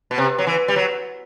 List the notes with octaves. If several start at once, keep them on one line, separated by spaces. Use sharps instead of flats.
B2
C3
F#3
E3
G3
F#3